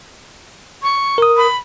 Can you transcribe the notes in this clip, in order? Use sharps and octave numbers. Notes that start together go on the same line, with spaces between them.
C#6
A#4 D#6
B5